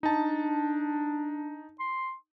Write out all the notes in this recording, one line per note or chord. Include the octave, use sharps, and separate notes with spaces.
D4 D#4 A5
C6